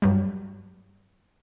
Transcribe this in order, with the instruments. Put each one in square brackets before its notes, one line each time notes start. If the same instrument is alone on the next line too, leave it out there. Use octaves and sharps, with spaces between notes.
[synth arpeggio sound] G2 F#3 G3